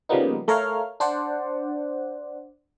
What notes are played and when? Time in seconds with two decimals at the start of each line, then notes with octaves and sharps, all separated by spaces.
0.09 C#3 F3 G3 A#3 B3 D#4
0.48 A3 A#4 C#5 F5 F6
1.00 D4 C5 D5 F#5